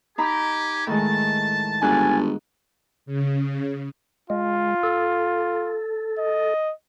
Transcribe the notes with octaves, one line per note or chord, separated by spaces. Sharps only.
D#4 G4 G#5 A#5 B5
A2 D#3 G#3 A5
G1 G#2 G#5 F#6
C#3
G#3 F4
A4
D#5